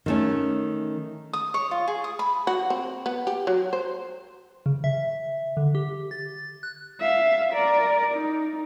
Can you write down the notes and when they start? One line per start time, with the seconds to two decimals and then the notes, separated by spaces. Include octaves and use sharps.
0.06 D#3 A3 C#4
1.33 D#6
1.54 C#5
1.71 F4
1.88 G#4
2.04 D#6
2.19 B5
2.47 F#4
2.70 C4
3.06 B3
3.27 G4
3.47 F#3
3.73 C5
4.66 C#3
4.84 E5
5.57 D3
5.75 G4
6.11 A6
6.63 F#6
7.00 E5 F5
7.53 A#4 D5
8.14 D#4